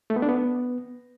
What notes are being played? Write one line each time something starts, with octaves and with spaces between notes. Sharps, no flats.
A3
B3
D4
B3